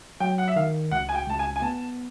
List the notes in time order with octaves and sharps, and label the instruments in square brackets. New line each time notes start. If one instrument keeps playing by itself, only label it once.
[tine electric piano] F#3 [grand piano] G5
[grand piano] F#5
E5
[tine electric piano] D#3 [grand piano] F5
[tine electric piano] C#2 [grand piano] F#5
[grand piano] G#5
G5
[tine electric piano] C#2 [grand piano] A5
[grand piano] G#5
G#5
[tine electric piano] B3 [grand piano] A5